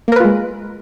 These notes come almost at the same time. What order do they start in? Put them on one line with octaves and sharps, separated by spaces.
A#3 A#4 B4 F4 G#3